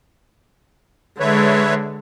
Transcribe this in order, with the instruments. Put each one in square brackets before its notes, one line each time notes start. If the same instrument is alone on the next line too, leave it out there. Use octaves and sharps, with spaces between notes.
[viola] D3 G#3 [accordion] B4 C#5 E5